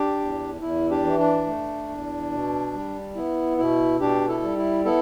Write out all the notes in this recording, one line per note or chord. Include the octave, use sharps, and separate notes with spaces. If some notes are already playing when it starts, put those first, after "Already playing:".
Already playing: D4 G4
E2
E2 E4
D4 G4
E3
D4
A3
E2
B2
G3
B3 E4
B2 E4
B2 D4 G4
E4 A4
G3
E4
B3 E4 A4